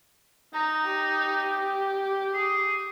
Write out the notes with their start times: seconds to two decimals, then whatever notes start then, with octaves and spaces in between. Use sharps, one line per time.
0.54 D#4 A#5
0.85 G4
2.34 G#4